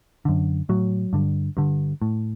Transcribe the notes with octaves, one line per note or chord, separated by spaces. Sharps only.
F#2 D3
A2 F#3
G2 D3
G2 D3
A2